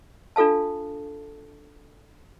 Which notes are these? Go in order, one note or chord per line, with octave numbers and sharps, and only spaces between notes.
D4 F4 A4 F5 A5